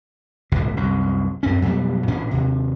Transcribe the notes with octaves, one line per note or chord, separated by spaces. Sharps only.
D1 G1 C#2 B2
C2 F#2
F#2 C4 C#4
F2 B2 F#3 G3
A1 A#2 C#4 D4
D#2 C3